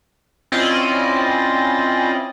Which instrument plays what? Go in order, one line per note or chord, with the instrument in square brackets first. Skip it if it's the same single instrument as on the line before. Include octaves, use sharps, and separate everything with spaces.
[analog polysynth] C4 C#4 E4 F4 D5 D#5